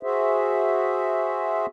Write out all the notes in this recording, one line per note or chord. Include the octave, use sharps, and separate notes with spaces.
F#4 G#4 C5 E5